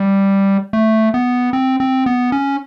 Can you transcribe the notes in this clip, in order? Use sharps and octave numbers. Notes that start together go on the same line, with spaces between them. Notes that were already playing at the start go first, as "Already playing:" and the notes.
Already playing: G3
A3
B3
C4
C4
B3
C#4